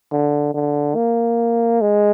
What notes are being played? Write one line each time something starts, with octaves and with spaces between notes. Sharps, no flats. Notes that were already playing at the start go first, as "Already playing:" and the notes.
D3
D3
A#3
G#3